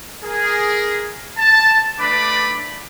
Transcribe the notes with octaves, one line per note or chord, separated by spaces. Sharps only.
G#4 A#4
A5
A3 D4 B4 D5 B5 D6